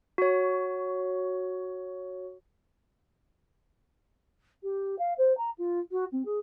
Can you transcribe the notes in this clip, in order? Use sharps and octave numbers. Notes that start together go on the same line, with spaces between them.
F#4 C#5
G4
F5
C5
A#5
F4
F#4
C4
G#4